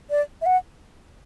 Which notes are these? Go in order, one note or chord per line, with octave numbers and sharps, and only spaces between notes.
D5
E5
F#5